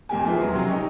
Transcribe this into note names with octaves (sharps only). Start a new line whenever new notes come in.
F2 A#3 G4 G#5
A#3 E4 F4 G#4 B4
E1 F#3 C6
C3 F#3 C#4
D#4 G4 D#5 C#6